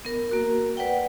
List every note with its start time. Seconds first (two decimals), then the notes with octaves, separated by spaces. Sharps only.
0.05 B3 A#4
0.30 A#3 F#4 A#4
0.77 B4 D5 F#5 G5